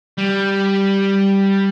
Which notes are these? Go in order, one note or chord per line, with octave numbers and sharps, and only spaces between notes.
G3